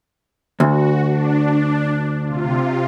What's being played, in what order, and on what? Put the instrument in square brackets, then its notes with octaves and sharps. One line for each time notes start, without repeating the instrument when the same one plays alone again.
[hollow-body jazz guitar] D2 [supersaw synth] F#4
[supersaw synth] D4
C3 F4